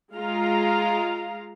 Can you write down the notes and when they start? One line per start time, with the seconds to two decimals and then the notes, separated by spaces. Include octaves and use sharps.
0.15 G#3 F4 F5 A#5